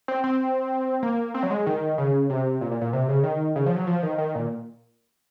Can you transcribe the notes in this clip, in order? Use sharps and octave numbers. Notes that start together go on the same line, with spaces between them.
C4
C4
A#3
C4
F#3
G#3
D#3
C#3
C3
A#2
A#2
A#2
C3
C#3
D#3
C#3
F3
F#3
F3
D#3
D#3
A#2